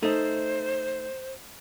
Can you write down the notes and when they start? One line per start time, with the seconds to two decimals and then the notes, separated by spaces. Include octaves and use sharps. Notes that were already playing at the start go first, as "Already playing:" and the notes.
0.02 A3 D#4 C5